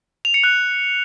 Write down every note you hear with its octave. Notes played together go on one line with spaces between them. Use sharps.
F7
C#7
F#6